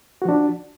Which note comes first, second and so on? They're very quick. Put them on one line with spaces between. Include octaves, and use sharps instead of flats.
F#4 F3 D4